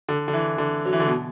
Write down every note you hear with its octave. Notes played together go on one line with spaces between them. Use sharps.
D3
D3
E3
D3
F#3
E3
D3
B2